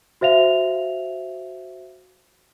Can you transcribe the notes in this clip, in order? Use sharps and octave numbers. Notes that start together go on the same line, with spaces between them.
F#4 C5 E5 F5 F7